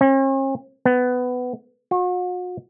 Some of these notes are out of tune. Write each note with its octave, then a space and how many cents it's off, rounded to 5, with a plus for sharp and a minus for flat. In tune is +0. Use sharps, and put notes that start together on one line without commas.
C#4 -45
B3 +15
F#4 -40